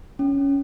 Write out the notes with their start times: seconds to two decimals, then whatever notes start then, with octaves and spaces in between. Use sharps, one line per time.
0.19 C#4